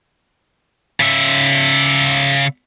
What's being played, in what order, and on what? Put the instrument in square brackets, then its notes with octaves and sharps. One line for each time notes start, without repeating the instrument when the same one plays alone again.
[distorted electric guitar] C#3 E5